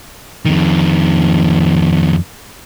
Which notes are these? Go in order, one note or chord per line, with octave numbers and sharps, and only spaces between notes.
F2 D#3